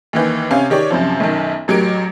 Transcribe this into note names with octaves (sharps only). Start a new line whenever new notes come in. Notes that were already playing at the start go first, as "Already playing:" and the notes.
D#2 D#3 E3
C3 C#4 F5 G#5
D#3 G4 C#5 D5
F#2 C3 F3
B1 F#2 D#3
A1 F#3 G4 A#4 D7